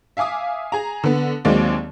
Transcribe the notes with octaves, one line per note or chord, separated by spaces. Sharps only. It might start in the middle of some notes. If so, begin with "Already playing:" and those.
E5 F5 G#5 D6 D#6
G#4 A#5
D3 B3
D#2 F#3 G#3 A#3 C4 D5